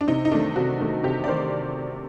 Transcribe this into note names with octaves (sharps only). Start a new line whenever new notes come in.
D4
C3 D#4
D#4
D#3 A3 D4
C3 F#4
D#3 A3
C3 G4
D5
D#3 C5